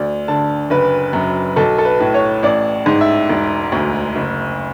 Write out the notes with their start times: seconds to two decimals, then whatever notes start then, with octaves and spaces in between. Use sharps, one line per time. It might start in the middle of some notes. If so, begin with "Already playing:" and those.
Already playing: D2 D5
0.28 D3 A5
0.70 F#1 B4
1.13 F#2
1.56 B1 A4
1.78 A4
1.85 B4
2.00 A2
2.14 C#5
2.43 A1 D5
2.86 G#2
3.01 E5
3.29 E1
3.72 D2
4.16 F#1